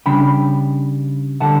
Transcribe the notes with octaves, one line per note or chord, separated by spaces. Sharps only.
C#3 G3 D4 G5 B5
D3 G3 F#5 A5